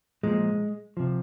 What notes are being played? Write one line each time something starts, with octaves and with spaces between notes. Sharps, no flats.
A#2 F3 G#3
C3 F3